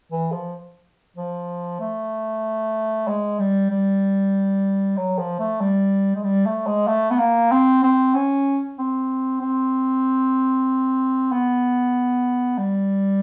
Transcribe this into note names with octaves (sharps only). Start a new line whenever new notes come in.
E3
F3
F3
A3
G#3
G3
G3
F#3
F3
A3
G3
G#3
G3
A3
G#3
A3
B3
A#3
C4
C4
C#4
C4
C4
B3
G3